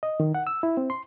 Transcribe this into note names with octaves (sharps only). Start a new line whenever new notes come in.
D#5
D#3
F#5
E6
E4
C4
C6